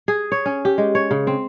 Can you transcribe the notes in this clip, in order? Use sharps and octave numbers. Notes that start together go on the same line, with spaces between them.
G#4
C#5
C#4
G4
G#3
C#5
C#3
C4